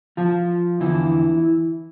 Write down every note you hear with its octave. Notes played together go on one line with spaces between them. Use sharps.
F3 F4
E2 D3 E3 F3 E4